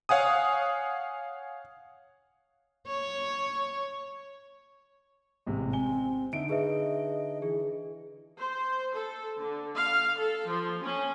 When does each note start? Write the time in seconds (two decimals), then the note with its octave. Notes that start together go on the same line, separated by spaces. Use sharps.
0.09 C#5 F5 F#5 G#5 D#6
2.87 C#5
5.46 A1 C3 G#3
5.73 C4 G#5 G7
6.33 D3 D#4 E5 D7
6.50 G#4 B4 D#5 E5
7.42 E3 G#4
8.40 C5
8.95 A4
9.37 D3
9.76 F5
10.17 A4
10.47 F3
10.80 C#4